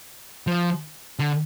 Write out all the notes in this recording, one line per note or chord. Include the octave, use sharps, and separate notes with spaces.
F3
D3